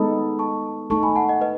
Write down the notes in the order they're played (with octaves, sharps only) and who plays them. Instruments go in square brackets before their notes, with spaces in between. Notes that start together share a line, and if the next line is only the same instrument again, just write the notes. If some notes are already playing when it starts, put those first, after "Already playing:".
Already playing: [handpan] G#3 B3 D#4 A4 [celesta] B5 D#6
[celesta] A5 C#6
[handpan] A3 D#4 A4 [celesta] A5 C#6
[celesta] G#5 B5
F#5 A5
D#5 F#5
B4 D#5